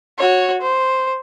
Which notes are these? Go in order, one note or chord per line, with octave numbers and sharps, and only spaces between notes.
F#4 C#5
C5